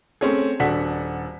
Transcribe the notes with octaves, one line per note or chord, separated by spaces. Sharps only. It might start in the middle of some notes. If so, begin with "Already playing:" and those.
A3 C4 C#4 G#4
D#1 D4 F#4 A4 F#5 B6